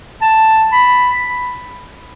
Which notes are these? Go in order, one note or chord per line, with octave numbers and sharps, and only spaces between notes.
A5
B5